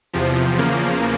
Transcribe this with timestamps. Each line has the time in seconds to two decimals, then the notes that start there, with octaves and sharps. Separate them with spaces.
0.13 E2 C3 F3
0.58 E2 C#3 F3 A#3